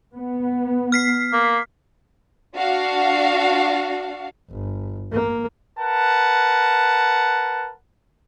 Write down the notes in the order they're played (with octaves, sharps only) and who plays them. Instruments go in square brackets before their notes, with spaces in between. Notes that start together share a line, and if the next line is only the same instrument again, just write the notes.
[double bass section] B3
[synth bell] F6 B6 C7
[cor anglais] A#3
[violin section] D4 F#4 F5
[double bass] G1
A#3
[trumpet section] A#4 B4 F#5 A5